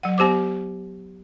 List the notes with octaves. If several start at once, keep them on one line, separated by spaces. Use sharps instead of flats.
F#3 F#5
B3 G4 C5 D6